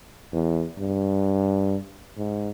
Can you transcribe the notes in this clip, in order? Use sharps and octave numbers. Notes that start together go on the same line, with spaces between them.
E2
G2
G#2